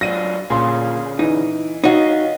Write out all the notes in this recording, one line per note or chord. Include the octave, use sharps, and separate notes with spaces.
F#3 D4 F4 A#6 D#7
A#2 D3 C#4 G#4 C6
E3 D#4
D#4 F#4 C#5 D#5 F5